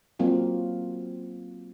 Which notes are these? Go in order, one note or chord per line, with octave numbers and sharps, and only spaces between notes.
F#3 A#3 C4 F4